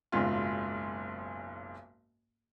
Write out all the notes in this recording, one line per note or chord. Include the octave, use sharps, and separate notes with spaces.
F#1 B1 G#2 F4